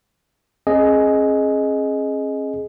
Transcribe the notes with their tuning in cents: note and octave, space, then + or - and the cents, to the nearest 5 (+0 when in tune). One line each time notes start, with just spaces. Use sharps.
C#4 -45 G#4 +15 D#5 +0